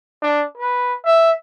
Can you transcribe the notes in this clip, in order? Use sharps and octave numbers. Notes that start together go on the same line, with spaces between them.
D4
B4
E5